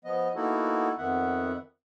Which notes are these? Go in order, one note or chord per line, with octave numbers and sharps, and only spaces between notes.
F3 B3 D#5
A#3 B3 D#4 E4 F#4 A4
F2 D#3 B3 E5 F#5